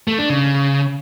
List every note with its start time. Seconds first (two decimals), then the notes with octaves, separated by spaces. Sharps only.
0.08 A3
0.19 D4
0.30 C#3